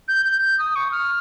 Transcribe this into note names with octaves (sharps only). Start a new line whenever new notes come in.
G6
G6
G6
D#6
C#6
F6